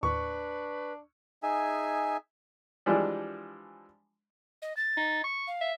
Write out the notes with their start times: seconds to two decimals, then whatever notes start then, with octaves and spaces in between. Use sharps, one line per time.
0.03 D#2 A2 D4 B4 C#6
1.43 D#4 G#4 E5 G#5
2.86 E3 F3 G3 G#3 D4
4.62 D#5
4.77 A6
4.97 D#4
5.24 C#6
5.47 F5
5.61 E5